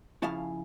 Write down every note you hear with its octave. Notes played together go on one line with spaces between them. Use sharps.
C#3 F3 C#4 E4 F5 A5